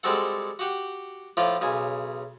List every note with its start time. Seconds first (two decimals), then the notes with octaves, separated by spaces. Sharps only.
0.03 G3 G#3 C4 F#4 A4 F#5
0.59 F#4 G4 F#5
1.37 A2 F3 F4 D5
1.61 B1 C#3 G#5